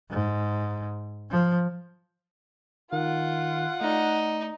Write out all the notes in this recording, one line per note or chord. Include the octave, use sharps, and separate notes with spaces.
G#2
F3
D#3 F4 F#5
A3 D#4 D5